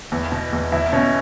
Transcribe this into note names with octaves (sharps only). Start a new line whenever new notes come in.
E2
B2
E2
E2 E4
B2 C#4